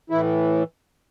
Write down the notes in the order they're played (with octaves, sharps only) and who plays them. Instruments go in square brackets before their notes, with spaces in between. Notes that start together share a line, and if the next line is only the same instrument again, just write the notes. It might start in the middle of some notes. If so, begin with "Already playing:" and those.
[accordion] A2 E3 E4